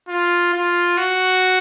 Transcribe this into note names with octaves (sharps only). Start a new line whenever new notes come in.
F4
F4
F#4